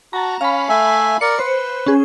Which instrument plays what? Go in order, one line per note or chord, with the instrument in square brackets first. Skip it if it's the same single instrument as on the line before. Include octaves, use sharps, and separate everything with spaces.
[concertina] F#4 [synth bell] A5 A#5
[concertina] C#4 [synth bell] F5 B5
[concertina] A3 E5 G#5
[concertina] A#4 D5 [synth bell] C#7
[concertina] B4 [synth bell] C5
[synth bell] C#4 G#4